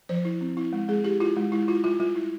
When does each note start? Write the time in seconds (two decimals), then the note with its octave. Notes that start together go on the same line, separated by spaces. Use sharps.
0.09 F3 C5
0.25 E4
0.41 C4
0.57 E4
0.73 G#3
0.88 G#3 G#4
1.04 E4 G4
1.20 E4 F4
1.36 G#3
1.52 G#3 E4
1.68 E4 F4
1.84 G3 F4
2.00 G3 F4
2.16 E4